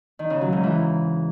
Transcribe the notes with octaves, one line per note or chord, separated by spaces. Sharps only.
D#3
C#3
F#3
G#2
E3